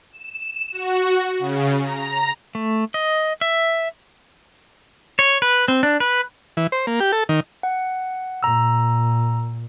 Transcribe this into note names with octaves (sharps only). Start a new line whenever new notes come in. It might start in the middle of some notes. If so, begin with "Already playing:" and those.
E7
F#4
C#3
A#5
A3
D#5
E5
C#5
B4
C4
D4
B4
E3
C5
A#3
G4
A4
D#3
F#5
A#2 A#5 E6